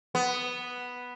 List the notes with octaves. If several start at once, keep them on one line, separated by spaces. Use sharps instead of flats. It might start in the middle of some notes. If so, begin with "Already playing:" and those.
B3